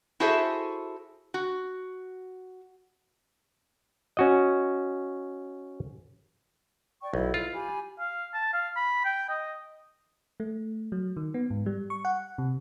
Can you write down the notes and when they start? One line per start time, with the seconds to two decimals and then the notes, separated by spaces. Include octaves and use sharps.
0.20 E4 F#4 G#4 A4 C5 E5
1.34 F#4
4.17 C#4 F#4 D#5
7.02 D5 G5 C#6
7.14 B1 E4
7.34 F4
7.52 G4 G#5 B5
8.00 F5
8.34 A5
8.53 F5
8.76 B5
9.05 G5
9.30 D#5
10.40 A3
10.92 F#3
11.17 D#3
11.34 B3
11.50 G#2
11.66 G3
11.90 C#6
12.05 F#5
12.38 C3